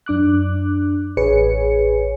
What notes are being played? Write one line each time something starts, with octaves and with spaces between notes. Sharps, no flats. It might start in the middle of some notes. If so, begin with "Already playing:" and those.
F#2 D4 D6 F#6
A1 G#4 B4 C#5 G#5 C#7